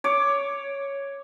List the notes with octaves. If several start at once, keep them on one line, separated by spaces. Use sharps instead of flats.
C#5 D6